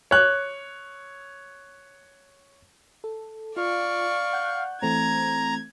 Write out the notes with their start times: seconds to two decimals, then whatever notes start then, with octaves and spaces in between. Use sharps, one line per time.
0.11 C#5 F#6
3.04 A4
3.57 F4 D5 F5 C#6
4.33 F#5 F#6 G6
4.82 E3 A3 C4 A#5 G#6